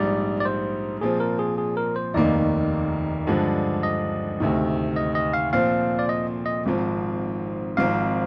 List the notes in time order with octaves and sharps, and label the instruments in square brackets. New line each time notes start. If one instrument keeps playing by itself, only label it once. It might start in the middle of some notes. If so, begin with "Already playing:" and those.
Already playing: [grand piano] A#1 G#2 G3 [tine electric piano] D5
[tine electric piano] D5
C5
[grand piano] A#2 F3 C4 [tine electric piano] G#4
[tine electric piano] A#4
G#4
G#4
A#4
C5
[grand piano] F1 D#2 D#3 A#3 D#4 [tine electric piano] D5
[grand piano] G2 D3 F3 G#3 D4
[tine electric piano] D#5
[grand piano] D2 C3 D#3
[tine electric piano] D#5
D#5
F5
[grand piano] A#2 F3 C4 [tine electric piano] F5
[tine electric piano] D5
D#5
D#5
[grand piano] G#1 G#2 F3 C4
[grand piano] G#1 G#2 F3 C4 [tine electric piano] F5